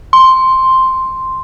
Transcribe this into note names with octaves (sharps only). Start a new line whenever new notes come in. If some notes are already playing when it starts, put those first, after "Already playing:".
C6